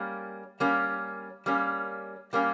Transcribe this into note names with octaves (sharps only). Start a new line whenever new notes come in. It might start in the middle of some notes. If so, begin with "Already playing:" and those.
Already playing: G3 A#3 C#4
G3 A#3 C#4
G3 A#3 C#4
G3 A#3 C#4